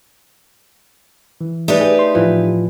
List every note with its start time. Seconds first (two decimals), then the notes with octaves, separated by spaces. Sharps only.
1.41 E3
1.68 A3 D4 D#4 G4 B4 D#5
1.81 G#4
1.99 C6
2.15 A2 E3 F3 F4